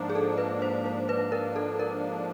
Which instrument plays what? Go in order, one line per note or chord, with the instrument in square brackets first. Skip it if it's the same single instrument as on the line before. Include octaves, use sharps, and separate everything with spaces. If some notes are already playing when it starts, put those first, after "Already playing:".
Already playing: [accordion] G#2 F3 A#3 D4
[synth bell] G#4
A4
B4
C5
C5
B4
A#4
A4
A#4